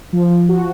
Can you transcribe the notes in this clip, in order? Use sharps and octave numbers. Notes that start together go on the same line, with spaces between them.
F3
F3
F#4